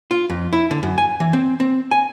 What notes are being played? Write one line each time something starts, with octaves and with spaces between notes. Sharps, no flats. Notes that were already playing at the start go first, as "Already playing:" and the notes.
F4
F2
E4
D3
F#2
G#5
E3
C4
C4
G#5